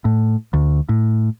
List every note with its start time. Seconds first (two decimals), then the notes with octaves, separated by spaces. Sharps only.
0.05 A2
0.53 D2
0.89 A2